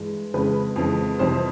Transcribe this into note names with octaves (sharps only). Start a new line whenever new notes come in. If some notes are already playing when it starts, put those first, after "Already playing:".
Already playing: G2 E3 G#3
F2 C#3 E3 G#3 B4
F2 C#3 E3 G#3
F2 C3 E3 G3 C5